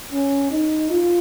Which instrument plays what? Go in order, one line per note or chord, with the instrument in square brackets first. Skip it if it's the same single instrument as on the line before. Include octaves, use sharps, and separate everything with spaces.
[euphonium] C#4
D#4
F4